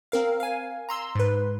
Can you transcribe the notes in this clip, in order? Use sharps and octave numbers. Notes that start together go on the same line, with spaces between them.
C4 A#4 F5
F5 G#5
A#5 C6 E6
G#2 B4